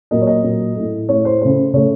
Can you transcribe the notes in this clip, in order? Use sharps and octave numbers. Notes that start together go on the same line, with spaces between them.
A#2 F#3 A#3 D#5
C#5
D#5
A#2 F#3 A#3
A2 A3
A2 A3 C#5
C5
C#3 A3 C5
C#3 A3 C#5